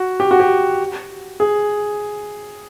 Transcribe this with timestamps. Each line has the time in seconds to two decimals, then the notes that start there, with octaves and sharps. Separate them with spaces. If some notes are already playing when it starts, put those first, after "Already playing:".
Already playing: F#4
0.20 G4
0.31 F#4
0.40 G4
1.40 G#4